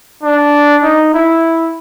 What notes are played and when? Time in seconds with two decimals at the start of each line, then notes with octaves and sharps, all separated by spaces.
0.23 D4
0.83 D#4
1.14 E4